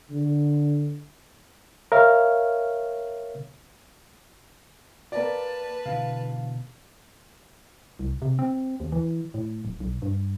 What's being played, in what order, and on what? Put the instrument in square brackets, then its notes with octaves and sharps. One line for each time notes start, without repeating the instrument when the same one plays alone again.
[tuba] D3
[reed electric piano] A#4 C#5 E5 F5 F6
[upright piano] A#3 D5 [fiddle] B4 A5
[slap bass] B2 D3 E3 [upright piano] F5
[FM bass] C2
C3
C4
D#2
E3
A2
D1
B1
G2